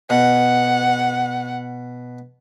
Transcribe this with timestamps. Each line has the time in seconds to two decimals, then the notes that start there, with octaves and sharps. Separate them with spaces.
0.10 B2 F#5